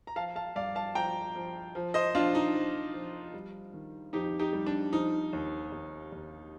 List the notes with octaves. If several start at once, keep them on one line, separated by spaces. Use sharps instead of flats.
A#5
F3 F5 A5
F5 A5
G2 D5 F5
F5 A5
F3 G5 A#5
F3
F3
C5 D#5
F3 D4 F4
D#4
F3
F3
G3
D#3
F2 D#4 G4
D#4 G4
G3
D4
F3 D#4
D#2
D#2
D#2